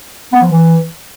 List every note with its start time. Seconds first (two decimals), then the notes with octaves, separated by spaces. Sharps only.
0.32 B3
0.42 F3
0.51 E3